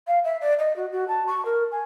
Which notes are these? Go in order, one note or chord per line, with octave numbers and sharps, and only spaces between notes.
F5
E5
D5
D#5
F#4
F#4
A5
C#6
A#4
G#5